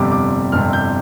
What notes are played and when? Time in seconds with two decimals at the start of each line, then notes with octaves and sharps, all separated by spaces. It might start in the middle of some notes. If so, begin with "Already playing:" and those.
Already playing: G1 F2 C3 G3 D6
0.12 D6
0.52 G1 F2 C3 G3 F6
0.73 G6